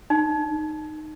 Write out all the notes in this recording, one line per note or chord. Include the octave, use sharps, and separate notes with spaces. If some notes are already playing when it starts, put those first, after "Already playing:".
D#4